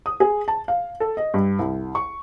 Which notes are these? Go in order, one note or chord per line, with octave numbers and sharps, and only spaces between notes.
D#6
G#4
A5
F5
A4
D#5
G2
C2
C#6